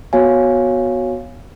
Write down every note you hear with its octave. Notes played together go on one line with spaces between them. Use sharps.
B3 F#4 C#5 F5 G#5